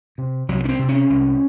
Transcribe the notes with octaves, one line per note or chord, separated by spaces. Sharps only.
C3
C2 F#3
C#4
C4
C3
C#4
C2